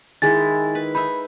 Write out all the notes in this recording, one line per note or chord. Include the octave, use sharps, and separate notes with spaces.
D#3 G#3 E4 G#4 G#5 A6
B4
D#4 G#4 E5 B5